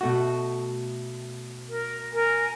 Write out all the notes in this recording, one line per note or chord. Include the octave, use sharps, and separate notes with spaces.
B2 A3 F#4
A#4
A#4 G#5